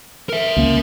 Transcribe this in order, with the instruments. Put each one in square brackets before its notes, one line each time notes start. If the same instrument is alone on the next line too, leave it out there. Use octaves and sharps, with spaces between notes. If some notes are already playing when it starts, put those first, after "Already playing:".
[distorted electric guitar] A#4 E5
[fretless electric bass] C#2 A#3